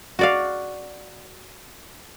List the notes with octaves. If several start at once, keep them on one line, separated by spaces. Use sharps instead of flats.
F#4 D5 F5